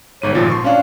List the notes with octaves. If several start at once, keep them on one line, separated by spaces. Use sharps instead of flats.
G1 G#2 C#5 D#7
G#1 A#2 F3 F4
C6 C#6
C#4 D4 F5